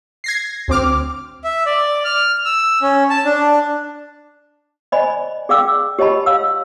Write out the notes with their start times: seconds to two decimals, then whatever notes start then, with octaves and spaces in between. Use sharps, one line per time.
0.24 G#6 A#6 C7
0.68 D2 C4 D6 F6
1.44 E5
1.66 D5
2.05 F6
2.45 E6
2.82 C#4
3.10 A5
3.25 D4
4.92 C5 D5 D#5 G#5 B5
5.49 G#4 D5 F5 G5 D6 E6
5.99 G4 C#5 D#5 A5 B5
6.26 C#5 F5 E6